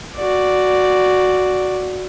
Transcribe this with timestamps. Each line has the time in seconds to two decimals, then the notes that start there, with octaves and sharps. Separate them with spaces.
0.17 F#4 D5